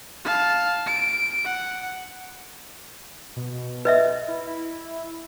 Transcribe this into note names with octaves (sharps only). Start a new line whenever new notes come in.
F5 A5
D7
F#5
B2
B4 D#5 E5
E4
E4